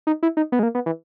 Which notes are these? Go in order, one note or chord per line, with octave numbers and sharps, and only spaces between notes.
D#4
E4
D#4
B3
G#3
A#3
B3
E3